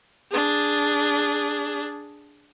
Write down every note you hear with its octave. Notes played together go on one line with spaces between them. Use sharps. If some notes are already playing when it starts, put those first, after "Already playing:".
D4 G#4